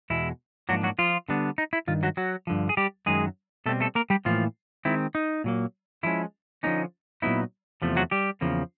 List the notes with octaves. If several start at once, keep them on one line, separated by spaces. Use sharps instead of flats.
E2 B2 G#3 E4
G#2 F3 F#3 A#3 D4 F#4
F#3 F#4
F3 F4
D3 G3 B3 D4
D#4
E4
G2 D#3 F4
F#3 F#4
F#3 F#4
G2 D3 F3
G#4
G3 G4
F#2 D#3 F#3 G#3 G#4
B2 G3 A3 C4 A4
A3 A4
A#3 A#4
G3 G4
A2 E3 F3 A#3 F4
D#3 G#3 C4 E4
D#4
A#2 F#3 A#3
D3 F3 G#3 C#4 E4
D3 F3 A#3 C#4 D#4
A#2 F#3 B3 D#4 E4
E2 C3 F3 A3
F#3 F#4
G3 G4
E2 C#3 F3 A#3